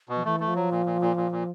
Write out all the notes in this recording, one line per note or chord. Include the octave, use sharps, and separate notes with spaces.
B2
F3
E3 A3
A3
F3
F#3
A#2
A#2
A#2
A#2
A#2